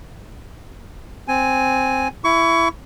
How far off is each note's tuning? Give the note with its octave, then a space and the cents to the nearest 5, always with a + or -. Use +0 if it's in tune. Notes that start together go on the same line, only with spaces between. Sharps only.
C4 +0 G#5 +0
E4 +15 C#6 +30